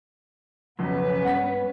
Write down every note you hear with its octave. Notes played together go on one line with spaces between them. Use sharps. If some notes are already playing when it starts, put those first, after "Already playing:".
B1 F2 C#3 B3 C#4 B4
G2 F#5 B6